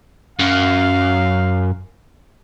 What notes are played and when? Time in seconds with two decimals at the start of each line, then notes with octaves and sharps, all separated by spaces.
0.39 F#2 F5